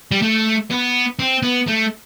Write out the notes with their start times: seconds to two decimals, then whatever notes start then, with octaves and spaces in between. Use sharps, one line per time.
0.11 G3
0.22 A3
0.70 B3
1.19 C4
1.42 B3
1.67 A3